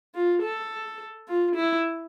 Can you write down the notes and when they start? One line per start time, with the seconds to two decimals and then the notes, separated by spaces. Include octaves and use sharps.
0.15 F4
0.43 A4
1.28 F4
1.56 E4